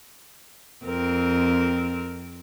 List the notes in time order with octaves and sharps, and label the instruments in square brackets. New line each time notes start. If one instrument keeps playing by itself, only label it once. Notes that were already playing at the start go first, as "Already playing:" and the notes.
[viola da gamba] F2 C4 A#4